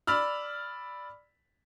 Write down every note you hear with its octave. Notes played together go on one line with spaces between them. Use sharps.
D5 B5 E6 F6